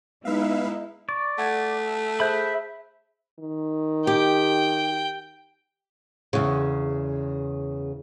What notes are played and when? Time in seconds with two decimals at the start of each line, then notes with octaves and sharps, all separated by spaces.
0.25 G#3 B3 D#4 E4 B4 E5 F5
1.09 D5 C#6
1.38 A3 F#5 G#6
2.20 G#4 C5 E5 B5 F#6 G6
3.39 D#3
4.07 G4 G5
6.33 E2 C#3